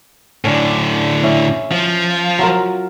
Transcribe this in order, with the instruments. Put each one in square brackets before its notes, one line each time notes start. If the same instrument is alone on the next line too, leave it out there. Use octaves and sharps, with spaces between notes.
[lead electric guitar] A2 D3 [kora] C#4 D4
[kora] C#4 E4
[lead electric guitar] F3
[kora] F#3 F4 A#4